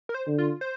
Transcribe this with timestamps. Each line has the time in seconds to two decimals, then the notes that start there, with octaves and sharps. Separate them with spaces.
0.09 A#4
0.14 C5
0.27 D3
0.38 F4
0.61 C5